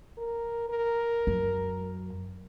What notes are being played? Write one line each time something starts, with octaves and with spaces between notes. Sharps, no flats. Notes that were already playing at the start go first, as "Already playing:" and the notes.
A#4
A#4
F#2